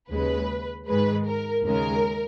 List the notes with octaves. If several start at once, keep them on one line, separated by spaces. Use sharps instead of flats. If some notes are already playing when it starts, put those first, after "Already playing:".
D#2 C#3 G#3 B4
G#2 D#3 G#3 B4
A#4
D#2 C#3 G#3 A#4